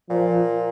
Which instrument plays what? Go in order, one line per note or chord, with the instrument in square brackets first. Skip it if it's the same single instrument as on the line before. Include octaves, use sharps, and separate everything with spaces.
[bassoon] A#2 [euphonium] F3